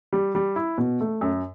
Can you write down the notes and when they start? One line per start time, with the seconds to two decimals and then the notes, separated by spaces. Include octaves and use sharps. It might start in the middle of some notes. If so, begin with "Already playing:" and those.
0.13 G3
0.35 G3
0.56 E4
0.78 B2
1.01 A3
1.21 F#2